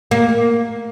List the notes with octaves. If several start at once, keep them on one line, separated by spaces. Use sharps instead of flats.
A#3